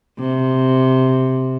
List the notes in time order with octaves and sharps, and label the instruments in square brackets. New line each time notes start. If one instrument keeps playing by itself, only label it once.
[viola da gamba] C3